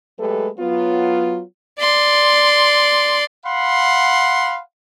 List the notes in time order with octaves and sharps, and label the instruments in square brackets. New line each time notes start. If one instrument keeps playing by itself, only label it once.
[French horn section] F#3 G#3 A3 G4 A4 B4
F#3 B3 F4
[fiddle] D5 C6
[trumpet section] F5 F#5 B5 C6